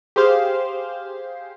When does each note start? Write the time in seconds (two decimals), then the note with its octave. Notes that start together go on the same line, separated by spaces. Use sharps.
0.16 G4 G#4 C5 F5 C6 F6